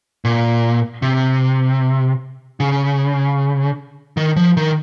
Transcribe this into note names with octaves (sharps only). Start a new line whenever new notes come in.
A#2
C3
C#3
D#3
F3
D#3